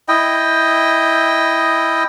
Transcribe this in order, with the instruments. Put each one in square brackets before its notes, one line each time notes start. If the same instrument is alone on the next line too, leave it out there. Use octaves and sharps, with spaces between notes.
[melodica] E4 D#5 G5